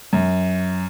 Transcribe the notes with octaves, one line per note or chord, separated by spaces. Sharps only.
F#2